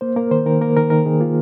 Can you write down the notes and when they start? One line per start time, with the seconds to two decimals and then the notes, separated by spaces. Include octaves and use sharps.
0.01 A#3 C5
0.16 A#3 A#4
0.31 D#3 C5
0.46 D#3 A#4
0.61 A#3 A#4
0.76 D#3 A#4
0.90 D#3 A#4
1.06 D#3 G#4
1.20 A#3 F4